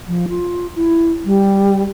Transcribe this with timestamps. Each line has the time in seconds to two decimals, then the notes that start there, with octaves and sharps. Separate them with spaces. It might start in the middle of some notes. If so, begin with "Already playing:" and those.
0.08 F3
0.29 F4
0.75 E4
1.25 G3